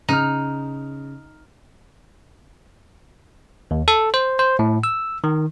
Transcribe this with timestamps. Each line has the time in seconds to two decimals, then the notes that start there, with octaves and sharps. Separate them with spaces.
0.09 C#3 D#4 F6
3.71 D#2
3.88 A4
4.14 C5
4.39 C5
4.59 A2
4.84 E6
5.24 D#3